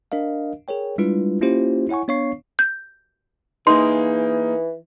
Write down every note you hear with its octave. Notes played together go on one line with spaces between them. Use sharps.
D4 A#4 D#5 F5
G#4 A#4 C#5 G5
G3 G#3 D4 E4 F4 B4
A#3 C#4 E4 F4 G4 C5
E4 C#5 F#5 G#5 C#6
B3 D4 C#5 F5 C#6 C7
G6
E3 A#3 D#4 G#4 C6